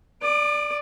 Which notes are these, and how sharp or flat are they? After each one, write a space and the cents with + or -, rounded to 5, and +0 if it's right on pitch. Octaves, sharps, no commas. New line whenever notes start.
D5 +0 D6 +45